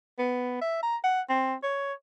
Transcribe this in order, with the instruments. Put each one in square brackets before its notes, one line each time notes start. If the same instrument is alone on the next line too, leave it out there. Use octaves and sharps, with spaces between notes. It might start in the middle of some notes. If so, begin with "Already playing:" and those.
[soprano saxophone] B3
E5
A#5
F#5
C4
C#5